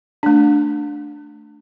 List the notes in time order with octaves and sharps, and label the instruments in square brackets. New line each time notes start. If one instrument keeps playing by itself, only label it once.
[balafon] A3 D4